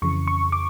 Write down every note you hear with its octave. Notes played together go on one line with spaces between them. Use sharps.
F2 C#3 E3 C#6
C#6
D6